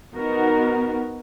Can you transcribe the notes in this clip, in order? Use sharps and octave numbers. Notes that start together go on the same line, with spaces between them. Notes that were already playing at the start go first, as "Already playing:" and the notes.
B3 D#4 F#4 A#4